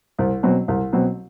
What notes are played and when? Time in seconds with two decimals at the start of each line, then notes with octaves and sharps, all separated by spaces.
0.19 C2
0.43 B2 F#3 C4
0.68 C2
0.93 B2 F#3 C4